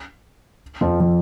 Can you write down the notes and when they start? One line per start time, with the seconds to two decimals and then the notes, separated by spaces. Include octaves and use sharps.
0.81 F2 F3
1.00 F3